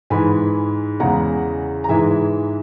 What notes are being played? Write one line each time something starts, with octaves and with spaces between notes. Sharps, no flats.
G#2 E3 G#3 G#5 B5
E2 C#3 G#3 F#5 A#5
A#5
G#2 E3 G#3 E5 G#5